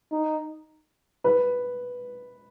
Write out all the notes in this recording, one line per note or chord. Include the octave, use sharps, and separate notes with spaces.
D#4
B4